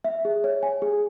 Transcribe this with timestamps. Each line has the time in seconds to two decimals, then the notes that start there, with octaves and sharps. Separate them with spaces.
0.04 E5
0.25 G#4
0.44 C#5
0.63 G#5
0.82 G#4